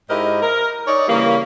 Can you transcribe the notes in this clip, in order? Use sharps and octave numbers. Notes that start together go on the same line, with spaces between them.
G#2 E4 G4 A#4 C5 D#5
A#4
D#4 C#5 D5
C#3 E3 G3 A#3